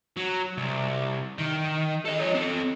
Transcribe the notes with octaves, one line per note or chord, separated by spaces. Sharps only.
F#3
C2
D#3
A4 D#5
F3 C#5
C4 A4